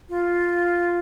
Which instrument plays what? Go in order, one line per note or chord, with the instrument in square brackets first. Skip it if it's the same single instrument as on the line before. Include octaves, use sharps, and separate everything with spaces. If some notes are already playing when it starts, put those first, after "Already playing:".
[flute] F4